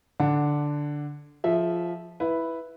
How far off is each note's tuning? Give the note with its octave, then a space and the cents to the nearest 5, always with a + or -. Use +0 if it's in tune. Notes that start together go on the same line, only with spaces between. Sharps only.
D3 +0 D4 +0 F#5 +0
F3 -5 G#4 +30 E5 -10
E4 +0 B4 +0